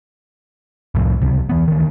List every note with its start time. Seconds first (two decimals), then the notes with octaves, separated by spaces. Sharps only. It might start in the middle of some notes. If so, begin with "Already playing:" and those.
0.95 C2 F2 A2 F3
1.22 C#2 C3
1.49 E3 B3
1.68 D2 D#3